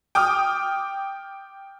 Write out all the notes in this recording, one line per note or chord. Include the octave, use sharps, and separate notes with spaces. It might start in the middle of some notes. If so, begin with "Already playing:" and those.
G5 D6 D#6 F6